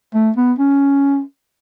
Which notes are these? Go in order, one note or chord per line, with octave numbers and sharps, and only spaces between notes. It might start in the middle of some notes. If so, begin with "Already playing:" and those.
A3
B3
C#4